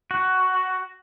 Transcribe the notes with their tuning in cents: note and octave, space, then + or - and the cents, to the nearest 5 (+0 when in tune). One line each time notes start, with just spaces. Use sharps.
F#4 +10